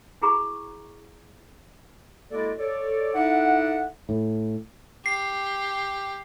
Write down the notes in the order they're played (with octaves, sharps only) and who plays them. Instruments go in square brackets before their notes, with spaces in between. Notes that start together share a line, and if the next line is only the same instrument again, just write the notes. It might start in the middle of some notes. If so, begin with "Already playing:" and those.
[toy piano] E4 F#4 G#4 A#5 B5 C#6
[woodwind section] G#3 A#3 E4 F#4 A4 D5
A4 C#5 D5
D#4 E4 A4 D5 E5 F#5
[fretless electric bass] A2
[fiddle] G4 [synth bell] C7